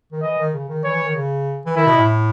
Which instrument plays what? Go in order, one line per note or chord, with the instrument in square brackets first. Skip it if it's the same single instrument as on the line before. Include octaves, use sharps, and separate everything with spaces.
[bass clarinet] D#3
[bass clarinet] E3 [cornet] D#5
[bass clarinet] D#3
C#3
D#3
[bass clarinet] E3 [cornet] C#5
[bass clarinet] E3
D#3
C#3
E3
[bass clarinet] D#3 [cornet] E4
[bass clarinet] B2
A2